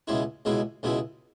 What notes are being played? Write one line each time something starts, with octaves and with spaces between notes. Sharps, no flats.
C#2 B2 G#3 E4 G#4
C#2 B2 G#3 E4 G#4
C#2 B2 G#3 E4 G#4